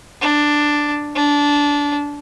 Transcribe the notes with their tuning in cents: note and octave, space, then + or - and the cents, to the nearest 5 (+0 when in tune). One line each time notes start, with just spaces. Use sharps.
D4 +5
D4 -20